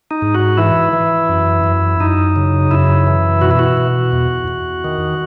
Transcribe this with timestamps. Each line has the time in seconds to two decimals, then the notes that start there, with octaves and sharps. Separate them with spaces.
0.11 D#4
0.22 G#2
0.35 F#4
0.57 E3 E4
0.93 E3
1.29 F#2
1.64 F#2
2.00 F#2 D#4
2.36 C#3
2.71 F#2 E4
3.07 E3
3.41 B2 F#4
3.51 E4
3.59 F#4
3.77 B2
4.12 E2
4.48 E2
4.84 D#3